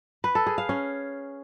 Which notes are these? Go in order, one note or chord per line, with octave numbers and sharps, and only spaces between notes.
B4
A4
G#4
F5
C#4